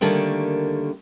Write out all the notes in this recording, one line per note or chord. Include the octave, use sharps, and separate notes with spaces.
D3 D#3 G3 A3 A#3